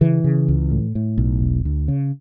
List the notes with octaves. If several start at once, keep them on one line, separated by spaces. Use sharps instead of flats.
C#3 E3
C#3
C#2
A2
A2
B1
E1
D2
C#3